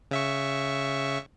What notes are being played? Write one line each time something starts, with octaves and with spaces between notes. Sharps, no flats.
C#3 E5 C#6